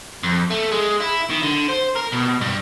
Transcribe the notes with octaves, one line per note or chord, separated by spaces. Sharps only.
F2
A3
G#3
E4
D#3
D3
C5
A#4
B2
G2